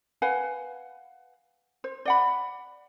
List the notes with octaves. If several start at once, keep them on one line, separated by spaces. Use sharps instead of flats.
B4 F5 F#5 G#5
C5
D5 F#5 B5